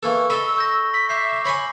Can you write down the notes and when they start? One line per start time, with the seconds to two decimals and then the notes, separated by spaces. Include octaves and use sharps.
0.03 E3 A#3 A4 C#6 E6
0.30 A4 D#5 B5 E6 G7
0.56 C#6 G6 A#6
0.94 B6
1.09 E5 D6 G6 C7
1.45 C#5 G#5 B5